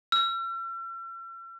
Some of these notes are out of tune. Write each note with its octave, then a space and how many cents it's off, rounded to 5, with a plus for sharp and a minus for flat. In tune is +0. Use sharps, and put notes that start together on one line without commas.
E6 +45